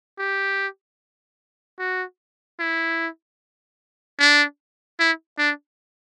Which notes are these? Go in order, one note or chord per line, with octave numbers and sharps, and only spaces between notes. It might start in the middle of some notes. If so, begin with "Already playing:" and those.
G4
F#4
E4
D4
E4
D4